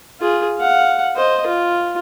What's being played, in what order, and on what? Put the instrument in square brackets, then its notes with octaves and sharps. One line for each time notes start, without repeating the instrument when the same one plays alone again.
[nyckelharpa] F4 G#4
F5 F#5
C5 D#5
F4